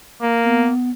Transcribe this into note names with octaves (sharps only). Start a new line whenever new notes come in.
A#3
B3